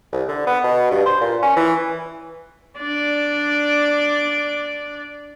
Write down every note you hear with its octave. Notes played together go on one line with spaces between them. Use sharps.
C2
D3
B3
B2
G2
C5
A#2
C#4
E3
D4 D5